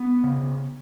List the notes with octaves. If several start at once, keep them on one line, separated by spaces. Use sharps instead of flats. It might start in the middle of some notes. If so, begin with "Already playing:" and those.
Already playing: B3
C#3